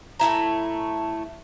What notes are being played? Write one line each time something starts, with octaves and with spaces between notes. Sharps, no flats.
A2 A3 E4 A#5